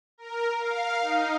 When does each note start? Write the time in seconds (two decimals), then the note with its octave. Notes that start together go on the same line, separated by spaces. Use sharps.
0.18 A#4
0.58 F5
1.00 D#4